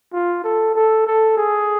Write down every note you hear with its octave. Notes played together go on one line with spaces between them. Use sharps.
F4
A4
A4
A4
G#4